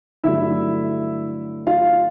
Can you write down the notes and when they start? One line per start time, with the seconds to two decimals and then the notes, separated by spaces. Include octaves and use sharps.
0.23 G2 D3 F#3 A3 D4 E4 E5
1.67 F4 F5